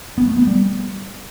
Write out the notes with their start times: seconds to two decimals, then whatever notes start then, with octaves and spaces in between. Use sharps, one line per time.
0.18 B3
0.27 A3
0.37 B3
0.47 G3